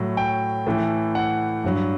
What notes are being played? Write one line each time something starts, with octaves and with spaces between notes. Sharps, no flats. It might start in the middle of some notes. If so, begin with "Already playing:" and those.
Already playing: A2 F#3
G5
A2 E3
F#5
G2 F#3